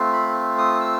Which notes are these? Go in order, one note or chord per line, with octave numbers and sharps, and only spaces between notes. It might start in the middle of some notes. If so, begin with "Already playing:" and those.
Already playing: A3 C4 F4
B5
D#6
E6